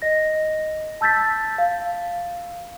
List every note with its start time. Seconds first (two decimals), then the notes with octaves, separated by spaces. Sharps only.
0.02 D#5 A#6
1.01 A5 E6 G6 A6 B6
1.58 F5